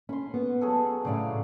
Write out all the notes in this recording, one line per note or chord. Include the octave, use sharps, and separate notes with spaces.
C#4 B5 C6
B3
F#3 G#4 A4
A2 C#3 F#3 D5 F5